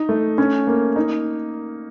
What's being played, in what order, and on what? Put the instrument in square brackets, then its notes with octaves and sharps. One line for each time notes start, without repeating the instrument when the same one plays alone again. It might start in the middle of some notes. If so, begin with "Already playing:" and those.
Already playing: [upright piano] D#4
A3
C#4
A#3
D#4